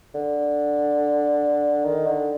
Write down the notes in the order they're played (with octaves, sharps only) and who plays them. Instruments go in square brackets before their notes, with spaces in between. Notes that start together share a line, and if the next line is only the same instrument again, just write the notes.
[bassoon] D3
D#3
D3